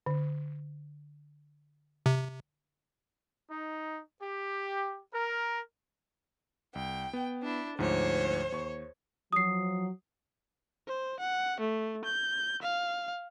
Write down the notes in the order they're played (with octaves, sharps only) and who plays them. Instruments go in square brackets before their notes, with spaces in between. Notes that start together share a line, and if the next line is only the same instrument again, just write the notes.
[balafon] D3
[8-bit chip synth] C3
[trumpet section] D#4
G4
A#4
[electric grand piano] C2 [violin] G5
[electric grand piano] B3
[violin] D4 E4
[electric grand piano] D2 G#2 F3 [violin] C5 C#5
[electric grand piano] D#2 C#6
[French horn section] F3 F#3 [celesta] D#6 C7
[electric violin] C5
F#5
A3
G6
F5